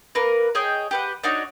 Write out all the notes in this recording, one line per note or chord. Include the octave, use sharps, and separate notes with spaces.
A#3 A#4 B4
G#4 C#5 D#5 G5
G4 B4 F#5
D4 D#4 F#4 C#5